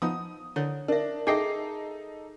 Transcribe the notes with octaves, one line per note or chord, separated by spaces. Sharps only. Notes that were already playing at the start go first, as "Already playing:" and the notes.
F3 B3 D#4 D#6
D3 E4 C#5
D4 A#4 E5
D#4 G#4 A4 D#5 E5 G5 G#5 C7